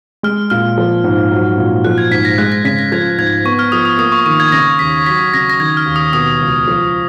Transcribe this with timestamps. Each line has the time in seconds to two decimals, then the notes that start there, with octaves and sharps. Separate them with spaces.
0.23 G#3 F6
0.50 A#2 F6
0.78 F3
1.04 G#2
1.32 F#3
1.58 A#2
1.85 F3 F#6
1.98 G#6
2.11 G#2 B6
2.25 A#6
2.38 G#3 F#6
2.52 A#6
2.65 C#3 B6
2.79 A#6
2.92 F3 G#6
3.18 G#2 G#6
3.45 B3 C#6
3.59 F6
3.72 F3 D#6
3.85 D#6
3.98 A#3 D#6
4.12 C#6
4.26 D#3 C#6
4.40 G#6
4.52 C#3 A#6
4.79 D#2 B6
5.06 F#3 B6
5.34 C#3 A#6
5.50 A#6
5.60 D#3 G#6
5.77 F6
5.86 D#2
5.96 D#6
6.13 B2 D#6
6.41 C#2
6.67 F3